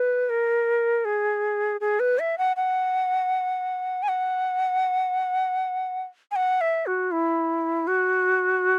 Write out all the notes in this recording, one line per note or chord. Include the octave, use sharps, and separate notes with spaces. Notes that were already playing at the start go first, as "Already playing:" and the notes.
Already playing: B4
A#4
G#4
G#4
B4
E5
F#5
F#5
G#5
F#5
G#5
F#5
E5
F#4
E4
F#4